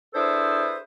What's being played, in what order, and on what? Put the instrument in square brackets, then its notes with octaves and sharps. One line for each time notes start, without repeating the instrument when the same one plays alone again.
[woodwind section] D4 E4 G#4 A4 B4 C5